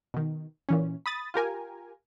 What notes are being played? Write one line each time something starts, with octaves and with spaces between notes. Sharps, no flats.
B2 D#3
A#2 E3 C#4
B5 D#6 A6
F4 G4 A#4 G#5